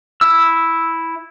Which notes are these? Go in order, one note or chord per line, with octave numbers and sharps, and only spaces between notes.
E4 E6